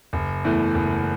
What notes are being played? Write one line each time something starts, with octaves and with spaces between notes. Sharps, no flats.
F#1
E2 E3 A3
F#1